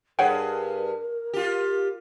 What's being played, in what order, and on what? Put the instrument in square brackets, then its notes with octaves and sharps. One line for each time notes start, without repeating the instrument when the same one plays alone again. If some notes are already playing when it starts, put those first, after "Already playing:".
[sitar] G2 G#4 B4 [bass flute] A#4 [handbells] C#5 F#5 G5
[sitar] F4 G4